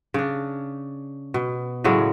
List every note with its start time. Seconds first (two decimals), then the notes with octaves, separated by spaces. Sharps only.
0.14 C#3 D4
1.34 B2
1.84 A2 C#3 F#3 G#3